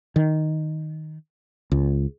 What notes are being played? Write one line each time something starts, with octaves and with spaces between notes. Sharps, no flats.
D#3
C#2